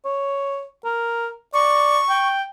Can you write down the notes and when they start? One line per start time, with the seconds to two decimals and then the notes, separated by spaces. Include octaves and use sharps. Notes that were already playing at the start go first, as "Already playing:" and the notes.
0.05 C#5
0.84 A#4
1.54 D5 C#6
2.09 G5